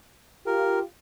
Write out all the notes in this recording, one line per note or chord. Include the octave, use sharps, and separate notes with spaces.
F4 G4 A#4